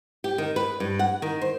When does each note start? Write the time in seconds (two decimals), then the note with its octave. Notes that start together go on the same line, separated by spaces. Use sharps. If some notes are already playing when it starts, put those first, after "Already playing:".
0.24 G4
0.38 D#3
0.56 B4
0.80 G2
0.99 F#5
1.22 D#3
1.41 C5